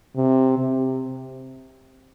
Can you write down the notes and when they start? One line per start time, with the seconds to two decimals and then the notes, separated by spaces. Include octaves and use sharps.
0.16 C3
0.58 C3